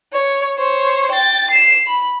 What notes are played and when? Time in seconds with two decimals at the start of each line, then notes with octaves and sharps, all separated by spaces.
0.13 C#5
0.58 C5 C#5
1.11 G5 A6
1.50 C7 E7
1.86 B5